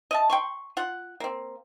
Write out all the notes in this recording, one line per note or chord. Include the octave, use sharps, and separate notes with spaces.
D#5 E5 A5
G5 C6 C#6
F4 F#5
A#3 C4